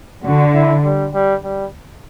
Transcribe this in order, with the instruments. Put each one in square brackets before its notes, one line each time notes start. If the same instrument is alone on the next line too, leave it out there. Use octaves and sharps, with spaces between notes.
[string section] D3 [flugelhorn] F#4
[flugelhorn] E4
G3
G3
G3